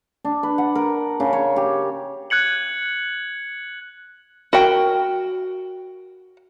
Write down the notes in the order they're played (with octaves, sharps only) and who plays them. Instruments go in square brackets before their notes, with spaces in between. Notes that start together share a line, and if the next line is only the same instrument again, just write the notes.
[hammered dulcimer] D4
B4
F#5
A#4
C#3
C#5
G4
[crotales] F#6 G#6 C#7 F#7
[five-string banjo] F#4 A#4 G5